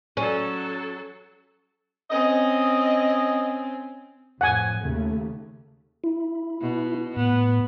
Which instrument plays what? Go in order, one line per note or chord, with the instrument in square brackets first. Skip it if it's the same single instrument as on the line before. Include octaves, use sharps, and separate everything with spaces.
[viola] F#3 A4 [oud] C#4
[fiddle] C4 C#4 [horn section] D#5
[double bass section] F2 A2 F3 [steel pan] F#5 G#5
[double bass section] D#2 C#3 A3
[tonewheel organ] E4
[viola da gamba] B2
[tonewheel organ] A2 [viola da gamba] B3